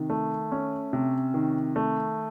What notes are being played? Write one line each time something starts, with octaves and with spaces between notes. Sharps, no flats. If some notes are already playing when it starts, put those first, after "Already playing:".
Already playing: C3 D#3
A3
C#4
C3
D#3
A3